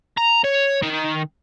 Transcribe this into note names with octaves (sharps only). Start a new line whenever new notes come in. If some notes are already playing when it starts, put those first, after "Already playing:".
A#5
C#5
D#3